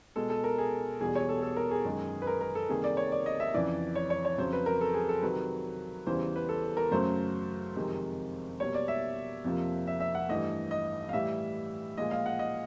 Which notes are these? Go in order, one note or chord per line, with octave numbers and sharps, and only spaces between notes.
B2 G#3 A4
A4
A#4
G#4
E2 B2 G3 G#4
C#5
A4
A4
A#4
G#4
F#2 D#3 G#3
B4
A#4
A#4
A4
C3 D#3 G3 A#3 G#4
D5
C#5
D5
D#5
E5
F2 C#3 E3 D5
C#5
C#5
C#5
F2 C#3 F#3 C5
B4
A#4
A4
G#4
A4
C3 D#3 F#3 B4
E2 C#3 E3 G3 C5
B4
A4
A#4
F#2 C#3 F#3 A3 C5
F2 C3 D#3 G#3
B2 G3 A#3 C#5
D5
E5
F2 C3 F3 A#3
E5
E5
F#5
G2 E3 A3 D#5
D#5
F5
A2 E3 G3 E5
A#2 F3 G#3 D#5
F5
F#5
D#5